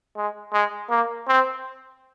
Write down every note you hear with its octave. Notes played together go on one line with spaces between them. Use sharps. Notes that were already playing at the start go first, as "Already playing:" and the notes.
G#3
G#3
A#3
C4